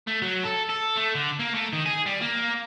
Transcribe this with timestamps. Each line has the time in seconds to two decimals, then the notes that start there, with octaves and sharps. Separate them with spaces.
0.08 A3
0.22 F#3
0.43 A4
0.69 A4
0.97 A3
1.15 D3
1.39 A#3
1.54 A3
1.73 D#3
1.86 G#4
2.06 G3
2.22 A#3